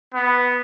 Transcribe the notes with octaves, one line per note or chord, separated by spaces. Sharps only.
B3